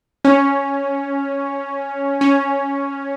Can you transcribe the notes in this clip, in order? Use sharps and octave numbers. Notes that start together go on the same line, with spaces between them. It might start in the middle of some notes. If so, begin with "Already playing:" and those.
C#4
C#4